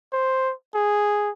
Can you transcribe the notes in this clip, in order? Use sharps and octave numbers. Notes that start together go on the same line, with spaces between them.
C5
G#4